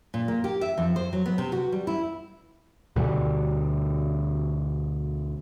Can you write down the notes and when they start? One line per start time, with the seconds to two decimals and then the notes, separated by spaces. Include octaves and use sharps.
0.14 A#2
0.28 A#3
0.44 G4
0.61 E5
0.78 F2
0.96 C5
1.13 F#3
1.26 B3
1.38 C3
1.52 F#4
1.72 G3
1.87 E4
2.96 D2 B2 D3 G3